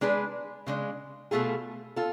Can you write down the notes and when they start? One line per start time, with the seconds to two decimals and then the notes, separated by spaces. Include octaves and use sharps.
0.01 G#3 D4 G#4 B4
0.67 C#3 G#3 D4
1.31 B2 A3 F4 G#4
1.96 F4 A4